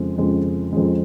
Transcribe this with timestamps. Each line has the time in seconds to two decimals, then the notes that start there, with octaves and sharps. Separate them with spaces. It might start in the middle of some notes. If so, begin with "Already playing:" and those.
Already playing: F2 C#3 G#3
0.18 F2 C#3 G#3
0.73 F2 C#3 G#3